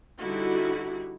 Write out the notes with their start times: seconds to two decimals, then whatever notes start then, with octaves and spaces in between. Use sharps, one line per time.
0.18 D3 G3 D#4 E4 F#4